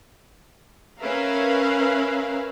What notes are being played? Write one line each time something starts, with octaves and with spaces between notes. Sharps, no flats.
C#4 A#4 B4 E5 F5